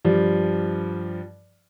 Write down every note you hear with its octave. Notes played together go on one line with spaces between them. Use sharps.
G2 F3 G3